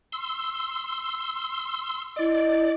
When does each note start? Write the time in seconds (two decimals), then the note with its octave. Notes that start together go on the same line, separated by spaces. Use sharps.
0.12 C6 E6
2.16 E4 D5 D#5